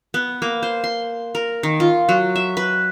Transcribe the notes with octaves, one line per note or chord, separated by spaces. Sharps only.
B3
A#3
C5
C6
A#4
D#3
F4
F#3
E5
B4